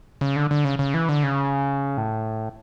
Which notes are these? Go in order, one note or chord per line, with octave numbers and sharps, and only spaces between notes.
C#3
D3
D3
C#3
C#3
E3
D3
C#3
A2